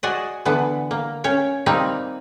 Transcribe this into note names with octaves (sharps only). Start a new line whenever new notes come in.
F#4 G#4 D5 D#5
D3 E3 B3
A#3
C#4 C#5 G5
G3 A#3 C4 D#4